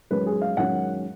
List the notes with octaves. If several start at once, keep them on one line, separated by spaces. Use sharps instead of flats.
F#2 D#3 G#3 C#4 B4
G#4
F5
F#2 D#3 G#3 C#4 F#5